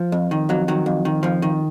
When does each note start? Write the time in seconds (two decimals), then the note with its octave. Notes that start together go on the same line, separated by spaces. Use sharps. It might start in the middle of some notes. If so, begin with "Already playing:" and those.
Already playing: F3
0.12 F2
0.31 D#3
0.49 F2 F#3
0.68 D#3 F#3
0.86 F2
1.05 D#3
1.23 F2 F3
1.42 D#3